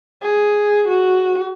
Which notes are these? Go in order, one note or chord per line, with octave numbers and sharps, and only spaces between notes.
G#4
F#4